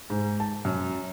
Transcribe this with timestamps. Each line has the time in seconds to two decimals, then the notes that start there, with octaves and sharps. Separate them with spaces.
0.10 G#2
0.40 A5
0.65 F#2